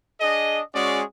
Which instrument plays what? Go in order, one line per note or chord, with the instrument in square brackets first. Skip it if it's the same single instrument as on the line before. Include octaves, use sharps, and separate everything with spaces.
[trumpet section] D4 G#4 D#5
G#3 C#4 F#4 G#4 D5